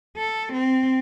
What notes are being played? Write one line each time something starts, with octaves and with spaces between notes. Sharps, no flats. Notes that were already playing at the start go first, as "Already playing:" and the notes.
A4
C4